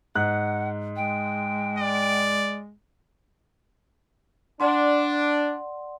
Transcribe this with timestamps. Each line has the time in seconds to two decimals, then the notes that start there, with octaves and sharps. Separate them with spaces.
0.15 G#2 F#5 F#6
0.96 G#3 G5
1.79 D5
4.60 D4 D5 F#5 C6